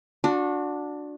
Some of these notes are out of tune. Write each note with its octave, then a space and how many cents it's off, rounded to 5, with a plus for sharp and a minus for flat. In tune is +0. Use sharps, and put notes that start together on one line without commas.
D4 +0 F#4 -30